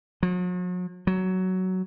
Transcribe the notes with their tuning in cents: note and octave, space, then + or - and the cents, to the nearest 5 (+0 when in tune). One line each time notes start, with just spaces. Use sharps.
F#3 -45
F#3 +10